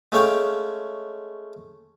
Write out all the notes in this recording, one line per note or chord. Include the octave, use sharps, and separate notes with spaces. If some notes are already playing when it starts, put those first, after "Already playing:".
G#3 A3 C#4 F5 G5